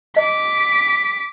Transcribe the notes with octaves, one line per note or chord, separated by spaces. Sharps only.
D#5 D6 B6